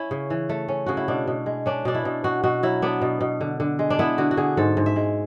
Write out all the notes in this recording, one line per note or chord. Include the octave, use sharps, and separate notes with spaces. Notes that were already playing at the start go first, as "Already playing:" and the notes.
Already playing: C#4 E4
C#3
E3
A3
C#4
C#3 F#4
E4
B2 D4
B2
G#3
C#4 D4
B2 D4
E4
B2
B2 F#4
B2 F#4
F#3 E4
B3 D4
B2
B2
D3
D3
G#3
D4
B3 E4
D3 F#4
F#4
D3 G#4
G#2 A4
G#2
E5
G#3